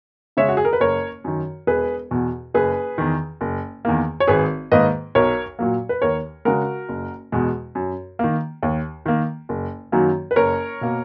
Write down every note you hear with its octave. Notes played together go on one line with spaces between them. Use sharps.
C#3 G#3 C#5 E5
F#4
G#4
A#4
B4
F#1 A#4 C#5
F#2 D#3
E1 G#4 B4
E2 B2
F#1 G#4 B4
E2 D#3
F#1
E2 D#3 A#3
C#5
G#1 G#4 B4
G#2 D#3 A#3 B4 D#5
B1 A#4 C#5
A#2 F#3 A#3
B4
D#2 A#4 C#5
C#3 G#3 F#4 A#4
F#1
E2 B2 G#3
F#2
D#3 A#3
D#2
D#3 A#3
F#1
F#2 D#3 F#3 A#3
B4
F#1 A#4 C#5
B2 A#3